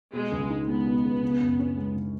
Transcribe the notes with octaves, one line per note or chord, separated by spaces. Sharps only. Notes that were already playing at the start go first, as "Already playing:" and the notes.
B2 G#3
C#2
D#4
G#3 B3
B2
C#2
C#3
F#2
C#4
G#3
C#3